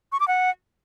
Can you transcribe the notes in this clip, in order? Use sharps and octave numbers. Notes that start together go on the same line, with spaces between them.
C#6
D6
F#5